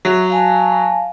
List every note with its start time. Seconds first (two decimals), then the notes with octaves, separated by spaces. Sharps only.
0.05 F#3 E5
0.30 F5 G#5 A5